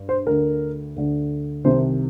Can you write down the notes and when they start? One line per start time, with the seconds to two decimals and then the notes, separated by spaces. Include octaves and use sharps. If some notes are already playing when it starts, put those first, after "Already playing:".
Already playing: G2
0.09 C5
0.26 D2 D3 A#4
0.96 D2 D3
1.64 C2 C3 D#3 C5